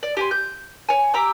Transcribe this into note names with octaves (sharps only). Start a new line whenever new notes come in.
D5
G4 G#5 C6
G6
C#5 G#5
G4 A#5 D6 E6